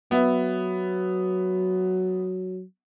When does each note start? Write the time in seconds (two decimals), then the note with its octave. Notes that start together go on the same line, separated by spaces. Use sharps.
0.11 F#3 B3 E5